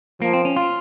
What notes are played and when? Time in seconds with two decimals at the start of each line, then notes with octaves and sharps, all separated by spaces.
0.21 F3 A#3
0.33 C4
0.45 C#4
0.56 F4